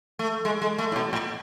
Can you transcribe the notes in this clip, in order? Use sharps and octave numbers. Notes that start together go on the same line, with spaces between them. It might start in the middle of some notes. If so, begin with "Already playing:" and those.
A3
G#3
G#3
A3
A2
B2
A2